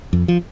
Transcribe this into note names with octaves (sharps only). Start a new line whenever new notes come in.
F2
F3